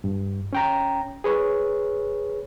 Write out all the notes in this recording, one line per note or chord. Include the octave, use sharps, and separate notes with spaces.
G2
C#4 G5 A#5
G#4 B4 C#5